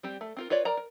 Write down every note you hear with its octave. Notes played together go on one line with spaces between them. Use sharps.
G3 C4 G4
A3
C4 F4 A#4
F4 B4 C#5 D5
A#4 D5 A#5
A#4